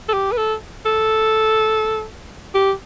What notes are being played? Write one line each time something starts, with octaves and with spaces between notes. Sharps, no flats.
A4
G4
B4
A4
A4
G4